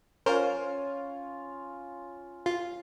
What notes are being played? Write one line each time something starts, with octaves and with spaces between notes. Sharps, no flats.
C#4 F4 A#4 C5
F4